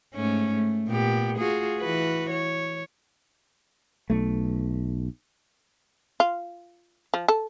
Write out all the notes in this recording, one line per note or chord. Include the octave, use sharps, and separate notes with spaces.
G#2 A3 C#4
A3
A#2 B3 G4
F4 F#4 G#4
E3 F#4 B4
C#5
B1 A3
F4
F3
A4